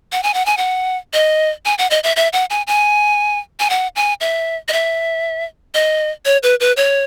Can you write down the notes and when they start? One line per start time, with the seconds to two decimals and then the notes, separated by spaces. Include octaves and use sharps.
0.12 F#5
0.23 G#5
0.34 F#5
0.46 G#5
0.57 F#5
1.13 D#5
1.65 G#5
1.78 F#5
1.91 D#5
2.04 E5
2.16 E5
2.33 F#5
2.50 G#5
2.67 G#5
3.60 G#5
3.70 F#5
3.96 G#5
4.21 E5
4.68 D#5
4.73 E5
5.74 D#5
6.25 C#5
6.43 B4
6.60 B4
6.77 C#5